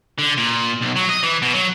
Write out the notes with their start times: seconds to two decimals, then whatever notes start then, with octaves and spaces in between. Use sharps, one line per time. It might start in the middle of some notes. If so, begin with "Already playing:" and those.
0.19 D3
0.38 A#2
0.82 B1
0.96 F#3
1.10 D#5
1.23 E3
1.42 B2
1.54 F#3